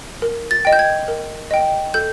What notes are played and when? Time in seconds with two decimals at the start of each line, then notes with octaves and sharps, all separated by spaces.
0.22 A#4
0.51 A6
0.65 D#5 G5
0.73 G6
0.79 G#6
1.08 A#4
1.51 D#5 G5
1.94 A4 G6